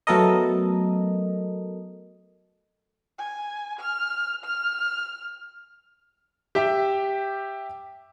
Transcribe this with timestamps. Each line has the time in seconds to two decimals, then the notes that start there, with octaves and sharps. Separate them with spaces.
0.07 F#3 A3 B3 A4 A#4 D#5
3.18 G#5
3.79 F6
4.44 F6
6.55 G4 E5 G5